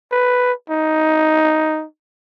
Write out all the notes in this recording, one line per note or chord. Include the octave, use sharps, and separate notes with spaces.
B4
D#4